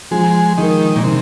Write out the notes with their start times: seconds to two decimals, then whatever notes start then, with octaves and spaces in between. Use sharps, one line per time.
0.11 F3 G#3
0.58 D#3 G#3 D#4 A#4
0.96 A#2
1.04 C3 D#3